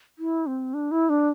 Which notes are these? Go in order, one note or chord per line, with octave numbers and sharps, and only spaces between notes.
E4
C4
D4
E4
D4